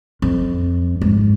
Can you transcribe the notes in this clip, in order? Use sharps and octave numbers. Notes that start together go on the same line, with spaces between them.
F2
G#2